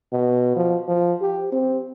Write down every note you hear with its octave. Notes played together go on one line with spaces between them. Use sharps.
B2
F3
F3
G4
C4